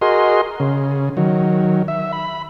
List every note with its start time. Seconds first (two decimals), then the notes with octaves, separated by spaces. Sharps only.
0.01 F#4 G#4 A#4 D#5 C6
0.60 C#3
1.17 D#3 F#3
1.88 E5
2.12 B5